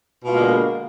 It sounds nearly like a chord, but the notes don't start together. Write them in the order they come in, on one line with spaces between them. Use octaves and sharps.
B2 F4 G#3 A#3 D3